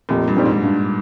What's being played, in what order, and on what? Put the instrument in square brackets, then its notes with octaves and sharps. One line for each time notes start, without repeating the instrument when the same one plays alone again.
[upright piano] F1 [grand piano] A#2
[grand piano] G2
[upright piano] F2 D#3 G3 C4
[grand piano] G#2
[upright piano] G2